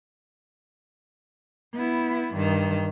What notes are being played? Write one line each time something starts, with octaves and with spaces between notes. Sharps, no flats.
B3 E4
G2 D#3